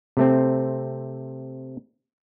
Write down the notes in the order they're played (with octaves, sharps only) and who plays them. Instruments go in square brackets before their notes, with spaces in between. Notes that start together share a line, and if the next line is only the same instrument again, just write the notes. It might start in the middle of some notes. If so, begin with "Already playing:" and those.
[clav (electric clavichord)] C3 A3 C4